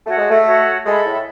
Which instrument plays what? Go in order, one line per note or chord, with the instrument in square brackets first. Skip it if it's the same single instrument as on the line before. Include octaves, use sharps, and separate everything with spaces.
[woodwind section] A3 [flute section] F#4 C#5 F#5
[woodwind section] G#3
A3
[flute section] F#4 C#5 F#5
[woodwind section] G#3 [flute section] A4 E5 B5
[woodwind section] A2